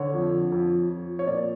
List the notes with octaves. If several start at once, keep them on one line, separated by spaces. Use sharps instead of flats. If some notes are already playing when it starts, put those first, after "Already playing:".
Already playing: D3 C#5
F2
F2
F2
C#5
A#2 D5